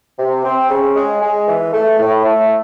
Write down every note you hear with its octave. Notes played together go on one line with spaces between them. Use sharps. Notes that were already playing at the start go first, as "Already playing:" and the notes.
C3
C4
C#3
G#3
G#3
E3
A3
A2
A3